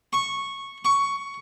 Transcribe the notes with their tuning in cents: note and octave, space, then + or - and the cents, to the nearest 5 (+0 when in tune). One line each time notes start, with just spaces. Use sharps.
C#6 -10
C#6 +10